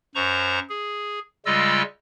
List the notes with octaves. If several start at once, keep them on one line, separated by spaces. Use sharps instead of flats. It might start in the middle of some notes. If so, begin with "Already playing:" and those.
F#2 C5 A#5 C#6
G#4
C#3 G3 G#3 F4 D#5 E6